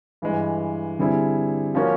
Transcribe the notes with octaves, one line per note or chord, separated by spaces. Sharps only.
G2 E3 G#3
D3 G3 C4 E4 G#4
F3 A#3 C#4 F#4